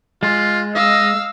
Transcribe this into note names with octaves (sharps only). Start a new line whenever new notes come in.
G#3 F4
D#5 F5 E6